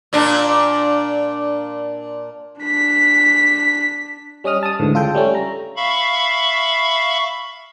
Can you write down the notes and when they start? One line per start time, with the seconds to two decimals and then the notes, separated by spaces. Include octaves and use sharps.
0.13 A#2 D4
2.62 D4 B6
4.44 G3 C#4 D#5 D#6 F6
4.63 A5 D#6
4.79 D2 G#2 D3 E3
4.94 C#3 F4 A4 G5
5.15 G3 A3 C#4
5.35 A#5
5.76 E5 F5 B5 C#6